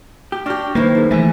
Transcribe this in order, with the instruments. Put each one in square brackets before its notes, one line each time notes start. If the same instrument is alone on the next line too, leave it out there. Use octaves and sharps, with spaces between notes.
[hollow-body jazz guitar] G4
[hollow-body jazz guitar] D4 G4 [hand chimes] C#6 F6 A#6
[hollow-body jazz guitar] B1 D#3 E4 [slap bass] A#3 [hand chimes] B4 C5
[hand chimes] D#4 G#4 A#4
[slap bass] E3 A3 [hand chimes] E5 G#5